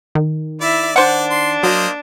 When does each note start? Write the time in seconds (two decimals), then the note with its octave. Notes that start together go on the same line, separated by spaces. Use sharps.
0.15 D#3
0.61 E4 D5 E5
0.96 D4 C5 D5 F#5
1.30 C6
1.63 F#3 A#3 C5 D#5